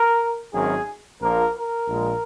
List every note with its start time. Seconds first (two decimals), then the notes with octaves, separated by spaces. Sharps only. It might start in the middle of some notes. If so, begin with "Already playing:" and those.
Already playing: A#4
0.52 G#1 F#2 D#3 G#4
1.20 A#1 A#2 F3 A#3 A#4
1.54 A#4
1.88 A#1 A#2 G#3